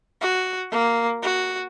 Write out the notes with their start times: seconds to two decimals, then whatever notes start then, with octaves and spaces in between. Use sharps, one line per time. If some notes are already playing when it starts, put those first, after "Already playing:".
0.21 F#4
0.72 A#3
1.23 F#4